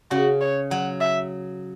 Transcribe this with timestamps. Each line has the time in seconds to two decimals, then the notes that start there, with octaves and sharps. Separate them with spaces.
0.11 C#3 F#4
0.41 C#5
0.70 F#3 F#5
1.01 E5